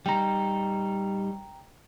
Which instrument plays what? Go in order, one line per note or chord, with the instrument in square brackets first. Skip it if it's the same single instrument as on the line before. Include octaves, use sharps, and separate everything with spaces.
[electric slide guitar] G3 D#4 [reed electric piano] G5 A#5